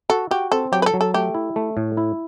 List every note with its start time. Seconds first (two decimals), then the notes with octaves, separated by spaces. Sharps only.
0.10 F#4 A4
0.31 F#4 G4
0.52 C4 A4
0.72 F#3 G4
0.82 B4
0.86 A4
0.94 F#3
1.01 A4
1.14 A3 G4
1.34 E4
1.56 A3
1.77 A2
1.97 E4